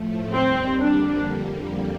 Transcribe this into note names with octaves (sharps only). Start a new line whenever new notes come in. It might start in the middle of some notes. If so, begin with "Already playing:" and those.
Already playing: A2 F3 A3
D#2 D#3 G3 C4
F2 D3 G3 A#3 D4